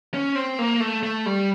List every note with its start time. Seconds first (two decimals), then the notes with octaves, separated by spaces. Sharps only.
0.14 C#4
0.35 C4
0.59 A#3
0.80 A3
1.03 A3
1.26 G3